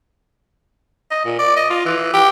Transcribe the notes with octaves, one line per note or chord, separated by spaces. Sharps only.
D#5
A#2
D5
D#5
F4
E3
G4